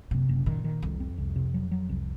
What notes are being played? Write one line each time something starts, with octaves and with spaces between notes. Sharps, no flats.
F#1 C3
F#1
A#2 D#3
D#3
C2 F2
C4
C2
C3
F#3
F#3
C2